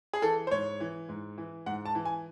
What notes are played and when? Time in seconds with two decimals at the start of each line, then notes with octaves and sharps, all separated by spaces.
0.13 G#4
0.22 E3 A4
0.47 C5
0.51 G#2 C#5
0.80 E3
1.09 G#2
1.38 E3
1.66 G#2 F#5
1.85 A5
1.95 E3
2.05 G#5